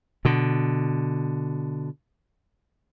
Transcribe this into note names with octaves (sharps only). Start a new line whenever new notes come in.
B2 D3